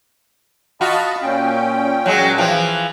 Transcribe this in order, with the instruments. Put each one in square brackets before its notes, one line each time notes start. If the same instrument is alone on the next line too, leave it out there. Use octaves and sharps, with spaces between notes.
[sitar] F4 F#4 [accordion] D#5 A5 B5
[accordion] A#2 C#4 G5
[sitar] F#3 G#3
E3 F3